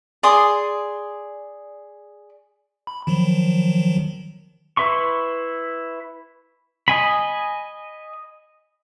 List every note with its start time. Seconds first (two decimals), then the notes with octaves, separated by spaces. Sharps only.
0.23 G#4 D5 C6 D#6
2.87 B5
3.07 D#3 F3 F#3
4.77 E4 B4 E5 C6 C#6
6.88 D#5 G#5 B5